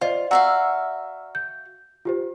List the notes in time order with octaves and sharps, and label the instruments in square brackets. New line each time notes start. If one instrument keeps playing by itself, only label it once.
[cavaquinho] F4 [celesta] C5 D5 D#5
[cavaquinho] F#4 E5 F5 [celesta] D5 A#5 E6
[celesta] G6
F4 G4 C5